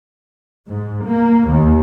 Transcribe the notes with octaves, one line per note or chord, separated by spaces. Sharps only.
G#2
A#3
D#2